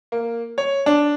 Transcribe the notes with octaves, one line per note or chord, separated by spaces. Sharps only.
A#3
C#5
D4